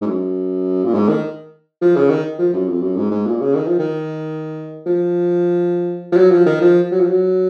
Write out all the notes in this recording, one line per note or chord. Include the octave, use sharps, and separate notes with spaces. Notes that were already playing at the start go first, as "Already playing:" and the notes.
G#2
F#2
A#2
G#2
D#3
F3
C#3
D#3
F3
F#2
F2
F#2
G#2
G#2
A#2
C#3
D#3
F3
D#3
F3
F3
F#3
F3
D#3
F3
F#3
F3
F#3